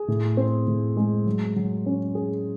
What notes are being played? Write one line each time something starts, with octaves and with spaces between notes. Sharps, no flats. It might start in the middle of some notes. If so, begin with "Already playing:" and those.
Already playing: G#4
A2
C4
A2
G#3
F#3
F#3
C#4
G#4